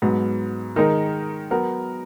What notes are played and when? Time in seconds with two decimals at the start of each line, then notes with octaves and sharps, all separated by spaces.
0.02 G#2 F#3 B3
0.76 D#3 G#3 D#4 A#4
1.51 F#3 B3 F#4 A#4